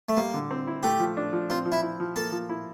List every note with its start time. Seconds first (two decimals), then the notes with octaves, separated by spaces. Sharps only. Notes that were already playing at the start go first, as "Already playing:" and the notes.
0.09 A3
0.17 G3 A#3
0.34 D3
0.51 C4
0.67 E4
0.83 A3 G4
1.00 F3
1.17 D4
1.33 F3
1.50 C4 F4
1.66 F3
1.72 E4
1.82 E4
2.00 F3
2.16 A#3 A4
2.32 F3
2.49 E4